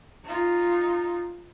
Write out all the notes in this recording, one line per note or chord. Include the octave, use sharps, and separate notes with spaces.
D#4 F4